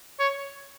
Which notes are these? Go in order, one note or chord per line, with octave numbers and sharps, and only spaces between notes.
C#5